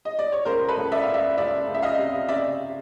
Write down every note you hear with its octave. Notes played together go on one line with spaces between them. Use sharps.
D#5
D5
C#5
C#2 A#4 C5
A4 B4
C#2
D5 E5
C#2 F5
D5 E5
C#2 D5 E5
C#2
E5
D#5 F5
C3
C#3 D5 E5